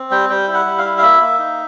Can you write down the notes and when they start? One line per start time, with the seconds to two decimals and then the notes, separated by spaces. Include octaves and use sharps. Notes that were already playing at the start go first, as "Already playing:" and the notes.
Already playing: C4
0.11 G3 G5
0.29 G3 G5
0.47 E4
0.54 F#5
0.66 G3
0.78 F5
0.84 E4
0.98 F5
1.02 A#3 E5
1.21 A#3
1.39 D#4